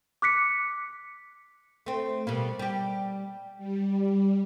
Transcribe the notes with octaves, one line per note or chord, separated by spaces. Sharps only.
D6 F#6 B6 C#7
A3 C4
B2 G3 A#3
G3 G4
G3